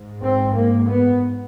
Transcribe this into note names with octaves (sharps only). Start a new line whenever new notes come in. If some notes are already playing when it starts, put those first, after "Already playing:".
Already playing: G#2
C4
A#3
B3